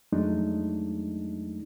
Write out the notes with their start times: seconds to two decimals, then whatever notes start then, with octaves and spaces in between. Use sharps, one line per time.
0.12 F2 F#3 G#3 A3 D4 D#4